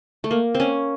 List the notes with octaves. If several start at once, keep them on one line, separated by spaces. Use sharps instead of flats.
A3
A#3
C4
C#4